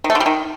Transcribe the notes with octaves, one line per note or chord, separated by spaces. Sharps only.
D#3
A3
D3
G3
D#3